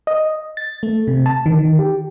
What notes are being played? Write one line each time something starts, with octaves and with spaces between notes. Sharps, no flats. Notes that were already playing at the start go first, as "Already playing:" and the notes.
D#5
A6
A3
C3
A5
D#3
D#3
G4